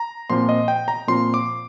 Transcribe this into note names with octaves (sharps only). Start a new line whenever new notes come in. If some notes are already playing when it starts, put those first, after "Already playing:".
Already playing: A#5
A#2 F3 C4 F4 C6
D#5
G5
A#5
A#2 F3 C4 F4 C6
D6